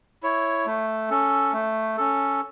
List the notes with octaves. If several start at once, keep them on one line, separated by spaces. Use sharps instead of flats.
E4 C#5
A3
C#4 A4
A3
C#4 A4